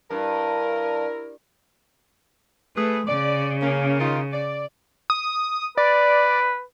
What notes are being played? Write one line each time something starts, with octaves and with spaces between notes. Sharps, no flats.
G2 E4 A#4
A3 G#4 B4
C#3 D5
A#3 C#4
D#3 D#4 F4
D5
D#6
B4 D5